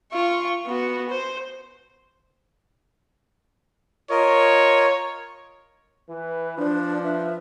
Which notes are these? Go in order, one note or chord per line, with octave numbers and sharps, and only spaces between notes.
F4 C#6
B3 F#4
C5
F4 A#4 C#5 D#5
E3 B4
F3 D4
B4 E5